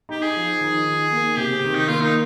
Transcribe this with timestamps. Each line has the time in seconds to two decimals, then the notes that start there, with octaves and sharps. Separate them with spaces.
0.09 D#4 G4
0.22 G#4
0.36 F3
0.61 D#3
0.87 D#4
1.11 A#3
1.37 C3 G4
1.64 D#3
1.75 D#4
1.88 A#3 F4
2.01 D#4